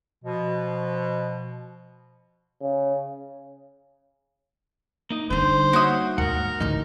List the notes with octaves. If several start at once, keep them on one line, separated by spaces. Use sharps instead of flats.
B2 F3
C#3
A#3 D#4 D#5
D3 G3 D#4 C5
A#3 F#4 C#5 E5 D#6
D#2 G#2 A#4 F#5
A1 D2 D#4